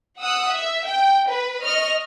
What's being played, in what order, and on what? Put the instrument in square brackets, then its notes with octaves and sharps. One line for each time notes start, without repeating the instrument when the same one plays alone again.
[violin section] F#5 D#6 E6 F#6
E5
G5
B4
D#5 C#6 F6